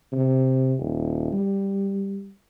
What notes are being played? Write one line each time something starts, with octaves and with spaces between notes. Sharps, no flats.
C3
D#1
G3